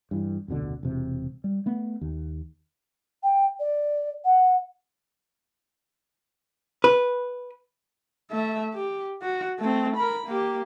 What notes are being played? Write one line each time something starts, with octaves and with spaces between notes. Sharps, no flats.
G2 E3
F1 D2 B2 D3
E1 C3
G3
A3 B3
D#2
G5
D5
F#5
B4
A3 E5
G4
F#4
A3 C4
A#4 B5
A#3 G4